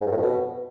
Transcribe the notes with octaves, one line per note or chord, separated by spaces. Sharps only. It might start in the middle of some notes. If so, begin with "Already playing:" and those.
G#2
G2
A2
F2
B2